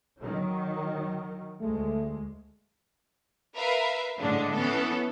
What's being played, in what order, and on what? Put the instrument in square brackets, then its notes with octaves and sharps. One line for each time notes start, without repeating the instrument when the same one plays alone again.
[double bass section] D#3 F#3
[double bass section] D2 G#3 [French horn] A3
[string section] A#4 B4 E5 F5
A2 D3 G#3 D4
E3 B3 C#4 A4